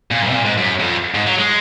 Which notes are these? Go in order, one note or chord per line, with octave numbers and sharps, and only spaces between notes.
A#2
F#2
C3
A#2
G#2
F#2
F2
G#2
F#3
G#3